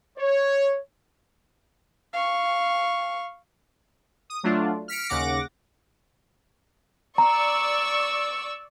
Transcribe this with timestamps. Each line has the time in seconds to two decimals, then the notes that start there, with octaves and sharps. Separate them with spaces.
0.18 C#5
2.13 F5 C#6
4.30 D#6
4.43 F#3 A3 D4 F4
4.88 F6 B6 C#7 D7
5.09 D#2 C#3 F#5 D6 A#6
7.18 D5 A#5 C#6 E6